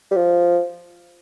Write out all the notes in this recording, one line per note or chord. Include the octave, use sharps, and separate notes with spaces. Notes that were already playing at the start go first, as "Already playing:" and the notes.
G3
F3